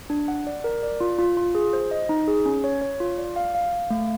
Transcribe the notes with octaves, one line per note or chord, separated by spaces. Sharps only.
D4
F#5
D5
A#4
D5
F4
F4
F4
G#4
C5
D#5
D#4
G#4
C#4
C#5
C#5
F4
D5
F5
F5
F5
A3